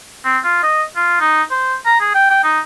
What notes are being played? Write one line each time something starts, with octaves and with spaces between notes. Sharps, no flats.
C4
F4
D#5
F4
D#4
C5
A#5
G#4
G5
G5
D#4